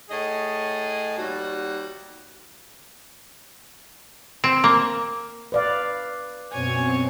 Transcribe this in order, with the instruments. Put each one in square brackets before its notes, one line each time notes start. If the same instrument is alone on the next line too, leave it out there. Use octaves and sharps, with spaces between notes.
[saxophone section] A2 G#4 D#5
D#2 G3 F#4
[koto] C4
A#3
[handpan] B4 D5 F5
[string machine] F#2 B2 C4 [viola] C#5 G#5